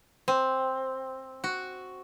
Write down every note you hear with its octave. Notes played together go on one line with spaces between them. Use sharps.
C4
F#4